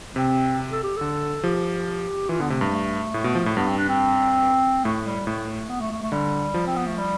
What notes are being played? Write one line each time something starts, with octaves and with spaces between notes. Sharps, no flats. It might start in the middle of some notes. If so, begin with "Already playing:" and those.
C3 C4
A4
G4
D3 A4
F3 G4
E3 F4
D3 B3
C3 A3
G2
A3
A2
B2
F3
A2
G2 B3
C4
D4
C4
A2 A3
G3
A2 A3
B3
A3
A3
A3
D3 G3
F3
C4
B3
A3
G3